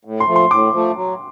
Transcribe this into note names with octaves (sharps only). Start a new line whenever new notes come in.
A2
C6
F3 A3
C6
A2 D6
F3 A3
F#3